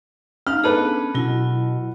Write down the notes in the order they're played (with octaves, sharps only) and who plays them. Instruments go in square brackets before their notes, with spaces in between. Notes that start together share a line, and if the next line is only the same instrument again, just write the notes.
[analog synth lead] C#4 [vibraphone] D#4 F5 [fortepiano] F6
[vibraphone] B3 D4 G#4 [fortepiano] A4 B4
[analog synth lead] B2 [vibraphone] F#3 E4 F4